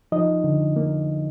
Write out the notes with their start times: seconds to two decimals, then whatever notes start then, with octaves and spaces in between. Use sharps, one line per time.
0.12 F3 D#4 D#5
0.44 D3
0.76 A#3